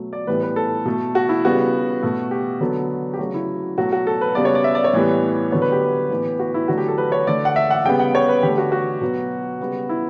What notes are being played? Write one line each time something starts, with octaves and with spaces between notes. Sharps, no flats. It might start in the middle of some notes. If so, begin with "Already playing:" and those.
Already playing: B2 F#3 A3
D5
A2 E3 G3 B3 B4
B4
A4
B2 A3
F#4
E4
C#3 G3 B3 F#4
B2 A3
G4
D3 F#3 B3 A4
G4
C#3 F#3 A3 F#4
E4
B2 F#3 A3 F#4
F#4
A4
B4
C#3 G3 B3 D5
C#5
D5
E5
D5
C#5
A2 E3 G3 B3
D3 F#3 B3 C#5
B4
G4
A2 E3 B3
F#4
E4
D3 F#3 A3 F#4
G4
A4
B4
C#5
D3 A3 D5
F#5
E5
F#5
C#3 G3 B3 G5
F#5
C#5
B4
D3 G4
A3
F#4
F#4
B2 F#3 B3
C#3 G3 B3
E4